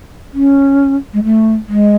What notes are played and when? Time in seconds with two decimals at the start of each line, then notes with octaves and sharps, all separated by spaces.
0.33 C#4
1.13 G#3
1.24 A3
1.68 G#3